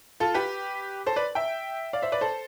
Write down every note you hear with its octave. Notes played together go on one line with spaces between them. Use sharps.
F4 A4
G4 B4
A4 C5
B4 D5
E5 G5
D5 F5
C5 E5
B4 D5
A4 C5